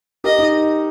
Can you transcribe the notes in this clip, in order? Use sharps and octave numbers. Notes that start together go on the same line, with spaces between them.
G4 A#4 D#5
D#4